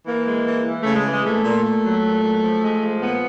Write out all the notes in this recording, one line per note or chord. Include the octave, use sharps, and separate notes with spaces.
E3 A#3
G#3
E3
E3
A3
C#3
G#3
E3
G#3
A#2 A3
A#2
A#2
F#3
A#2
F#3
F3
G#3
F3
A#2 B3